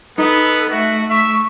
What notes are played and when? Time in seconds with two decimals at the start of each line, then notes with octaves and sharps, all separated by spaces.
0.18 B3 D#4 A4 B4
0.71 A3 F#4 E5
1.09 E5 C#6